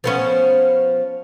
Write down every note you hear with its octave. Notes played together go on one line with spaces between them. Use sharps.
F3 B3 C#4